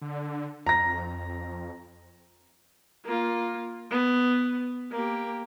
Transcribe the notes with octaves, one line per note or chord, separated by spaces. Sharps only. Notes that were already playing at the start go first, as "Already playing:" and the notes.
D3
F2 A#5 A#6
A#3 F4
B3
A#3 G4